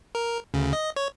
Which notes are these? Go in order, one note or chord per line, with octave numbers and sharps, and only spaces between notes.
A#4
D2 C#3
D#5
C#5